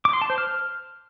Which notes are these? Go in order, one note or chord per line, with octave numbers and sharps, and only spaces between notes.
D6
C6
A5
C5
F6